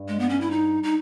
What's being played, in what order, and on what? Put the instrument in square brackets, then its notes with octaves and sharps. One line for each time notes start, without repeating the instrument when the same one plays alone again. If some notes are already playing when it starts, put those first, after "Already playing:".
Already playing: [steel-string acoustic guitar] G2
[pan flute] G#3
B3
C#4
E4
D#4
D#4